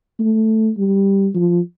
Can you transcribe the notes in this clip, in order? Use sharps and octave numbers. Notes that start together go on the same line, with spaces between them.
A3
G3
F3